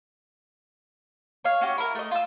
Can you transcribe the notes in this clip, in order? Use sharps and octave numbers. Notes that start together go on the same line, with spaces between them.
C#5 F5
C#4 F#4 G4
E4 A#4
A3 D#5
F4 E6